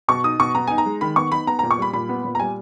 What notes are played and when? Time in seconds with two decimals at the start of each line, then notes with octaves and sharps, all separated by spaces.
0.08 B2 C#6
0.24 D#4 D#6
0.40 B2 C#6
0.55 B3 A#5
0.68 D#4 G#5
0.78 A#5
0.85 G#3
1.01 D#3 B5
1.16 B3 C#6
1.32 D#4 B5
1.47 B3 A#5
1.59 A#5
1.63 A#2
1.71 C#6
1.78 G3 B5
1.93 A#2 B5
2.09 B3
2.24 A#2
2.35 A#5
2.40 G3 G#5